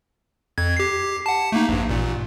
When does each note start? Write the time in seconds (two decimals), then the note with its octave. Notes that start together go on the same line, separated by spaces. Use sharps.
0.58 F2 G#6
0.77 G4 C7
1.26 F#5 A5
1.52 A3 A#3 D#4
1.69 A#1 G2
1.89 A1 A#2